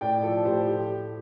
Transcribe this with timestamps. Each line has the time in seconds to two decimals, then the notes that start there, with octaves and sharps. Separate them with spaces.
0.01 A2 D5 G5
0.23 F3 A4 D5
0.45 A2 G4 C5
0.68 G4